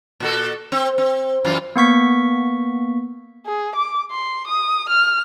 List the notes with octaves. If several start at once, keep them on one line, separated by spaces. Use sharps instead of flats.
A#2 F#4 A4
C4
C4
F#2 E3 F4
A#3 B3 C#6 B6
G#4
D6
C6
D#6
F6